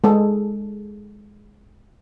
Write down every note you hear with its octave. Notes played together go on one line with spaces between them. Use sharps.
G#3 G#4 A4